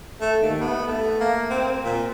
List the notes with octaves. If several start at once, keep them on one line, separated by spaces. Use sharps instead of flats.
A3
D#2
B3
A3
A#3
C4
A#2